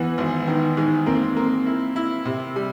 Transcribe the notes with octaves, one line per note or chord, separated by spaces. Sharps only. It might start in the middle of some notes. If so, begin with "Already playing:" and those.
Already playing: E2 E3 B3
G#1
D#3
G#2
A#3 C4
A#3
E4
E4
C3
G3